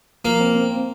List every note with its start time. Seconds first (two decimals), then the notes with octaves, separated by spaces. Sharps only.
0.25 F3 A#3
0.40 C4
0.55 C4
0.71 C4